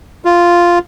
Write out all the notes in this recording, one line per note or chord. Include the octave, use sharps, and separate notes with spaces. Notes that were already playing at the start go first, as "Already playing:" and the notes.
F4